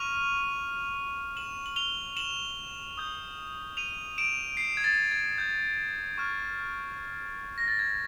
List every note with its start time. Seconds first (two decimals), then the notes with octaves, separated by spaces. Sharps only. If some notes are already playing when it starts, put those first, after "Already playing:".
Already playing: C#6 F6 D#7 F7
1.37 E7 F#7
1.66 F#7
1.76 F7 G7
2.17 E7 F#7
2.98 D#6 G6
3.77 D#7 F7
4.18 D7 E7
4.57 C7
4.77 G#6
4.84 A6
5.11 G#6
5.38 G6
6.18 C#6 F6
7.58 A#6
7.68 A6
7.79 G#6